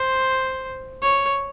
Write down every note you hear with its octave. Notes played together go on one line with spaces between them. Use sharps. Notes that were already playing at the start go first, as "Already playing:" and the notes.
Already playing: C5
C#5